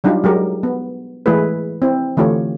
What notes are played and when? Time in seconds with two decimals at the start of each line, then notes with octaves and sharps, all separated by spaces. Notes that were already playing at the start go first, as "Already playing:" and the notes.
0.04 F#3 G3 D4 D#4 F4 G4
0.24 F#3 G#3 G4 A#4
0.63 B3
1.26 E3 G#3 A3 E4 G#4 B4
1.82 C4 E4
2.17 D3 E3 A3 F4 G4 C#5